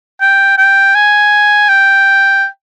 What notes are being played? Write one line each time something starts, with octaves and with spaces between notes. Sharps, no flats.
G5
G5
G#5
G5